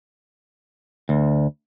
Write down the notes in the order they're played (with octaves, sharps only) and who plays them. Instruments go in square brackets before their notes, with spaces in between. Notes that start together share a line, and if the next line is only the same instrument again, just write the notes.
[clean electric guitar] D2